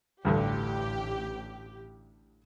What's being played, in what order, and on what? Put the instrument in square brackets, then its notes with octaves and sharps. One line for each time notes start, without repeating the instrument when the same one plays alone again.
[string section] A1 G4 [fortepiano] D2 G2 D3